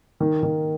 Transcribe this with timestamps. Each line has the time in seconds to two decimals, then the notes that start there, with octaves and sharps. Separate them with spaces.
0.20 D#3
0.43 D#3